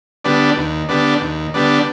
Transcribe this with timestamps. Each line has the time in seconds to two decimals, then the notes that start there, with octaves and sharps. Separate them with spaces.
0.24 D3 G3 B3 D4
0.57 D#2
0.89 D3 G3 B3 D4
1.21 D#2
1.54 D3 G3 B3 D4